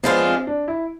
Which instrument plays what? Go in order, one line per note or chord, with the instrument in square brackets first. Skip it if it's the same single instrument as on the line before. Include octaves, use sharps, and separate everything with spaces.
[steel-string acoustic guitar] F3 G#3 D4 F4 [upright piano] B3
[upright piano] C4
D4
E4